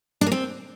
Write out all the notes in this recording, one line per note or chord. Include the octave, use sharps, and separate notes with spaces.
D4
A#3
C4